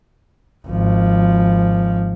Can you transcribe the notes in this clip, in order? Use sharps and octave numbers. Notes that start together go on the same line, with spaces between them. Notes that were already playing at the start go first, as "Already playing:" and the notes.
G#1 F3